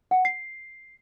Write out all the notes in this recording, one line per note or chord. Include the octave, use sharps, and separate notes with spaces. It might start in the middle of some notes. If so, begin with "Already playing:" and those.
F#5
C7